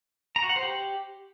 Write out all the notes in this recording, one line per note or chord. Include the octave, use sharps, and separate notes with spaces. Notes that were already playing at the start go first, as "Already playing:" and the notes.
A#5
F#4
F#5
C5
G4